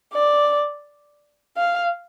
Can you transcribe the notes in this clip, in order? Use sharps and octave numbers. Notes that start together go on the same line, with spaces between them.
D5
F5